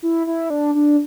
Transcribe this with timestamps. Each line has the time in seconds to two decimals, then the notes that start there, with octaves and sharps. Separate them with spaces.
0.03 E4
0.27 E4
0.50 D4
0.75 D4